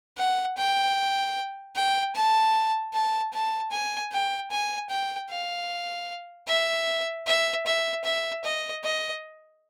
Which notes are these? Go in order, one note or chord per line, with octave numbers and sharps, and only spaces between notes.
F#5
G5
G5
A5
A5
A5
G#5
G5
G#5
G5
F5
E5
E5
E5
E5
D#5
D#5